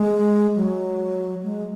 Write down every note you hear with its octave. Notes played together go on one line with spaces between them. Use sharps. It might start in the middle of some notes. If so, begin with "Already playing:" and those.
Already playing: G#3
F#3
G#3